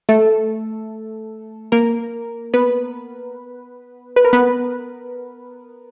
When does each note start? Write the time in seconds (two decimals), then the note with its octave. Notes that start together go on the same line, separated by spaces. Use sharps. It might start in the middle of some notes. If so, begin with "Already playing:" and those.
0.09 A3 A4
1.72 A#3 A#4
2.54 B3 B4
4.16 B4
4.25 A#4
4.33 B3 B4